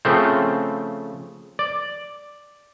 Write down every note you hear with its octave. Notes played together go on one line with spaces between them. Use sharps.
C#3 F3 A3 C4 C5
D5